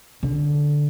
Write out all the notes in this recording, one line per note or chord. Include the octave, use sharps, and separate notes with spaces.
D3